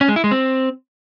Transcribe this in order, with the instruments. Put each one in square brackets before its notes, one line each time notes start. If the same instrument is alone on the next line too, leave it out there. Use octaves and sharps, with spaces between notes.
[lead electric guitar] C#4
G#3
E4
G#3
C4